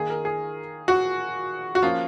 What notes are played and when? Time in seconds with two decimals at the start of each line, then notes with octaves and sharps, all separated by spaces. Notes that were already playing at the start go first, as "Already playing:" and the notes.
Already playing: D#3 A#3 D#4 G#4
0.10 A#4
0.25 G#4
0.88 F#4
1.75 F#4
1.82 F3 A#3 C#4 F4